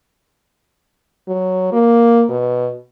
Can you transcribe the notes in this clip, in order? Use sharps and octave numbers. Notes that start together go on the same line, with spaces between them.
F#3
A#3
B2